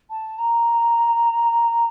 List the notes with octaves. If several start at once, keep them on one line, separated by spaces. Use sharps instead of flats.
A5
A#5